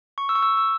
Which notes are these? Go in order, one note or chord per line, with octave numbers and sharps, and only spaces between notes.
C#6
E6
C#6
E6
E6